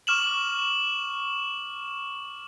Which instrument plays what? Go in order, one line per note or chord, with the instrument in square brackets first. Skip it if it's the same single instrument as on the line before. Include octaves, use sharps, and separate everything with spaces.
[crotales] C#6 D6 F6 E7 F#7